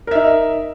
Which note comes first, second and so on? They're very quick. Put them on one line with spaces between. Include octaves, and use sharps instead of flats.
A#4 E5 D#4